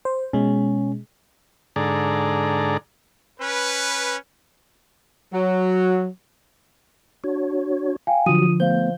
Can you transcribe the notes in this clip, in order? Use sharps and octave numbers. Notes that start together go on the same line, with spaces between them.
C5
B2 G#3 C#4
G#2 D3 G#4 A4 D5 A#5
C#4 B4
F#3
D4 F#4 C#5
F5 G5 G#5
D3 F3 F#3 F4 F#4 D#6 D#7
A3 B3 C5 F5 G6